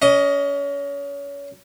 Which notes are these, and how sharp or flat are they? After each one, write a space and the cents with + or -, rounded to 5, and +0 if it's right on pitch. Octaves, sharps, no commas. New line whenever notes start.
C#4 +30 D#5 +5